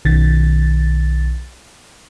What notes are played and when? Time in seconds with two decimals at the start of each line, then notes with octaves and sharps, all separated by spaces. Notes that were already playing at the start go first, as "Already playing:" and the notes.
0.05 B1 D#3 A6